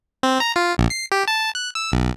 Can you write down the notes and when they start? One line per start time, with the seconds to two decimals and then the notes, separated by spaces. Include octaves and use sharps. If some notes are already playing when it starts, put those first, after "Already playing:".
0.23 C4
0.40 A#5
0.56 F4
0.78 A#1
0.90 C7
1.12 G4
1.28 A5
1.55 F#6
1.75 E6
1.92 B1